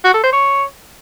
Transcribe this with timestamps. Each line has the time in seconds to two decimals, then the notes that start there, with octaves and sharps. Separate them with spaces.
0.05 F#4
0.14 A4
0.23 C5
0.33 C#5